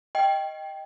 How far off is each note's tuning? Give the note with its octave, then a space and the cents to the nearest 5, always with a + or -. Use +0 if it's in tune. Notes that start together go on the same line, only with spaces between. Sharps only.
D#5 +5 G5 +0